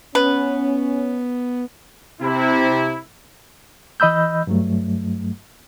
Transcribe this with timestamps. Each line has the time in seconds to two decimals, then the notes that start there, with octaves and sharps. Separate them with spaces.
0.15 B3 C#4 B4
2.21 C3 E4
4.00 E3 D#5 B5 E6 G6
4.47 G2 F#3 A3